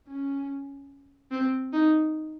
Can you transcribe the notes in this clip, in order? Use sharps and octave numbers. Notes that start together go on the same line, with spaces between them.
C#4
C4
D#4